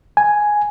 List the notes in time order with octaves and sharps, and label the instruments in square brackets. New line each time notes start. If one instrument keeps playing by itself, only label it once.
[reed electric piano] G#5